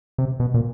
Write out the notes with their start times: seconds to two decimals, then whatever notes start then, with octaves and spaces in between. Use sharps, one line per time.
0.18 C3
0.40 B2
0.54 A#2